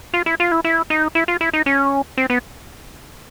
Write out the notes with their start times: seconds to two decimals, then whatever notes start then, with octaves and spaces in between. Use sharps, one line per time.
0.14 F4
0.26 E4
0.40 F4
0.52 E4
0.64 E4
0.90 D#4
1.15 E4
1.28 F4
1.41 E4
1.53 D#4
1.66 C#4
2.17 C4
2.30 B3